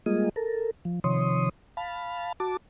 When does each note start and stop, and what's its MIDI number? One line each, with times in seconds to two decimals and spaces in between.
0.06 0.29 55
0.06 0.29 56
0.06 0.29 58
0.06 0.29 65
0.06 0.29 68
0.06 0.29 75
0.36 0.71 69
0.36 0.71 70
0.85 1.00 53
1.04 1.49 48
1.04 1.49 51
1.04 1.49 53
1.04 1.49 73
1.04 1.49 84
1.04 1.49 87
1.77 2.32 77
1.77 2.32 81
1.77 2.32 83
2.40 2.57 66
2.40 2.57 81
2.40 2.57 86